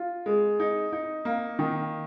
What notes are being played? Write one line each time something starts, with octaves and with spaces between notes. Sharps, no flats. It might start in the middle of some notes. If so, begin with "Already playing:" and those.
Already playing: F4
G#3
D#4
D#4
A#3
D#3